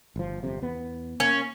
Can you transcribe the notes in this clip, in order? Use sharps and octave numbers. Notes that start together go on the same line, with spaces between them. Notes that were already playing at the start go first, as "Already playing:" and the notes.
G1 F3
G1 F2 C3
E2 B3
A#3 C#4